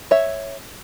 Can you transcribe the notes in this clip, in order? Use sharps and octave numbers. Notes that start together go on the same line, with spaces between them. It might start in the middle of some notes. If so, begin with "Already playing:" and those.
C#5 E5